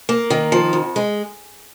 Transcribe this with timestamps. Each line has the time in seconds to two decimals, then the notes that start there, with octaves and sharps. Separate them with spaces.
0.09 A#3
0.30 D#3
0.52 F3
0.73 F2
0.96 G#3